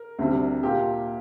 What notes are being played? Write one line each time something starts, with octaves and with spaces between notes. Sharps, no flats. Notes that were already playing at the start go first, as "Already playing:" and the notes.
Already playing: A#4
D2 C3 G3
A#2 A#3 F4 G4